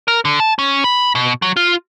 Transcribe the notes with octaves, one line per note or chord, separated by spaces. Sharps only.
A#4
D3
A5
C#4
B5
B2
F#3
F4